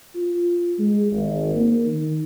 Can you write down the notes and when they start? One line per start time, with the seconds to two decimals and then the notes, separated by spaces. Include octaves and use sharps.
0.15 F4
0.79 G#3
1.11 G#1
1.55 A#3
1.85 D#3